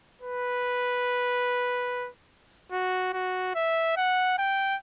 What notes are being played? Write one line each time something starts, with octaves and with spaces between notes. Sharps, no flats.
B4
F#4
F#4
E5
F#5
G5